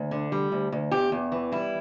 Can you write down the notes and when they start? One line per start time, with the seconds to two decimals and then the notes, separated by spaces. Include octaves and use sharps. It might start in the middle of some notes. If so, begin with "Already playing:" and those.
Already playing: D2
0.11 D3
0.32 G3
0.52 D2
0.72 D2
0.91 E2 G4
1.12 E2
1.32 E3
1.52 G3 E4